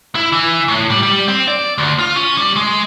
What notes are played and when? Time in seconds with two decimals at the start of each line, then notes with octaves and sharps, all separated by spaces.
0.15 E4
0.32 E3
0.68 A2
0.90 G3
1.03 G3
1.28 C4
1.48 D5
1.78 D2
1.99 F4
2.16 C#4
2.37 G3
2.57 G#3